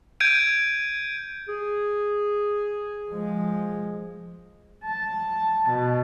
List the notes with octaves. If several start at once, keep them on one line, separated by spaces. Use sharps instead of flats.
G6 G#6 D7 D#7
G#4
F3 G#3
A5
B2